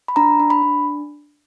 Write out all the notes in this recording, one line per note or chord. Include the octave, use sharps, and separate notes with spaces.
B5
D4 A#5
D4
B5
D4